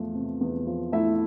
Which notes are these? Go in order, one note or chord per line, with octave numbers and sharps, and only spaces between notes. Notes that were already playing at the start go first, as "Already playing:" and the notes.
Already playing: E2 F3 A3
C3
E2
F3
A3 E4 E5